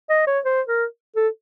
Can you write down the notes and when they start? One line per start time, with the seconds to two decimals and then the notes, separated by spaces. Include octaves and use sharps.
0.09 D#5
0.27 C#5
0.45 C5
0.68 A#4
1.16 A4